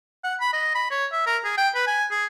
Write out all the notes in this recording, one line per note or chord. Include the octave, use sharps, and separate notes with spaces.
F#5
B5
D#5
B5
C#5
E5
A#4
G#4
G5
B4
G#5
G#4